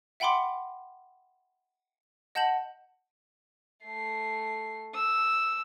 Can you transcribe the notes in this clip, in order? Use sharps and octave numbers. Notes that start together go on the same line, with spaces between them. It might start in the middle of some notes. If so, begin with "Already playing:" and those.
E5 F#5 G5 B5 C6 D6
D#5 F#5 A5 G6 E7 F#7
A3 C7
E6